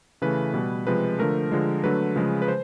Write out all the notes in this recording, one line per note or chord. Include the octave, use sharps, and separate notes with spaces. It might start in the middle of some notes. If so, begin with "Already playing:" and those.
C#3 E3 A3 B4
B2 G3
C3 F3 G#3 B4
D3 F3 A3 A#4
D3 F3 G#3
D3 F#3 A3 B4
C#3 F3 G#3
B4
C5